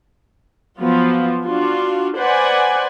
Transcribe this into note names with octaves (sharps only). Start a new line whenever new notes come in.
F3 F#3 B3 F4
D4 F4 F#4
B4 C5 D5 F#5 G#5